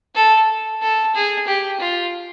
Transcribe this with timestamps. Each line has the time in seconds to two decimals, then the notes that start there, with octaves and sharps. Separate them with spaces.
0.15 A4
0.82 A4
1.15 G#4
1.47 G4
1.80 F4